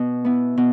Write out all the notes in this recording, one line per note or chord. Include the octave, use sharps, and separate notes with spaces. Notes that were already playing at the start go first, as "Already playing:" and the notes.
Already playing: B2
B3 E4
B2